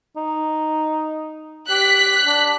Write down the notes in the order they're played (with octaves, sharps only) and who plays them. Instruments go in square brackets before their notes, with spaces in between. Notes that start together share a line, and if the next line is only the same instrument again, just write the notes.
[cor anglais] D#4
[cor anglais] G4 [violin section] F#6 B6
[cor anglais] D4